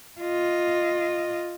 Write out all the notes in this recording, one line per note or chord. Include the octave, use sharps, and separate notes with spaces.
F4 D#5